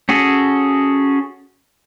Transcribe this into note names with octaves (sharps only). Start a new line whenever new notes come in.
C#4 F#4 G#4 A4